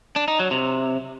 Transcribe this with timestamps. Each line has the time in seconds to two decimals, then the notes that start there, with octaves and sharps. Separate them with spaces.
0.16 D4
0.28 D#4
0.39 F#3
0.51 C3